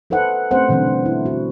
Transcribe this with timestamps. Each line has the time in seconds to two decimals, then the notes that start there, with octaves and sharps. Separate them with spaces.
0.10 D#4 A4 B4 C5 F#5
0.51 A3 C4 C#4 G4 C5 F#5
0.69 B2 D3 E3 G3 C4 D4
0.87 D3
1.06 E4
1.26 F#4